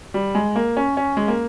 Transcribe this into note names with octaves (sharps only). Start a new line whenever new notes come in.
G3
G#3
A#3
C#4
C#4
G#3
A#3